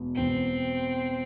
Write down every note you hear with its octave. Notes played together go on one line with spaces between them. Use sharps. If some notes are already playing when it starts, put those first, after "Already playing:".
Already playing: E1 E2 B2
E1 E2 B2 C4